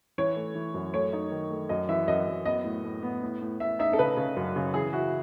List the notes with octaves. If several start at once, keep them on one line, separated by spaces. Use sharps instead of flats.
E3 C#5
A3
E3
F#2
A3 C#5
D#4
D#3
A3
F#2 D#5
E3 E5
F#2 D#5
F#2
B3 D#5
A2
A2
B3
A2
A2
A2 E5
D#4 E5
A4
C#3 B4
C#3
F#2
C#3
E3 G#4
E4 F#4